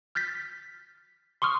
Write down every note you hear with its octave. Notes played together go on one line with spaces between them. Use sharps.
F6 G6 A6 B6
C6 C#6 D#6 F6